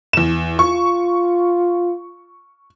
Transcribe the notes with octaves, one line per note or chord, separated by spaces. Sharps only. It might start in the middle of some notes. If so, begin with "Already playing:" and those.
E2 E7
F4 C#6